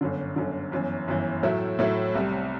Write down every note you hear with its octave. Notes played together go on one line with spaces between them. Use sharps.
G1 F#2 D3
G1 F#2 D3
G1 F#2 E3
G1 F#2 E3
A2 F#3 A3 E4
A2 F#3 A3 E4
C2 C3 G3